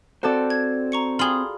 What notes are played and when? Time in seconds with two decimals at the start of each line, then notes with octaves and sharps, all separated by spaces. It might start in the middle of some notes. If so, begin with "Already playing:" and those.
0.23 C4 F#4 A4 C5 D5
0.50 G#6
0.92 A#5 C#6 C#7
1.19 F4 G#4 B5 C6